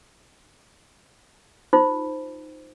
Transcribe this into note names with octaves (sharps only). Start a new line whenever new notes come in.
D#4 F4 C5